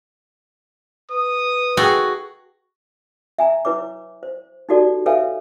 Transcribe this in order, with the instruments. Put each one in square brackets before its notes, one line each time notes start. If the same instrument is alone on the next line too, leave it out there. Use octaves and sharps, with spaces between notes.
[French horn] B4 [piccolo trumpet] D#6
[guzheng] F#4 [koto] G#4 A4 G5
[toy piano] E5 G#5 A#5
E4 B4 C#5 D6
C5
D#4 E4 F#4 G4 A4 D5
A4 B4 C#5 E5 F5 G#5